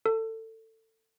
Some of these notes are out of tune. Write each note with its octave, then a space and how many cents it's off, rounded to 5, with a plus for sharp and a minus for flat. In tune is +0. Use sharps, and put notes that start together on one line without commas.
A4 +25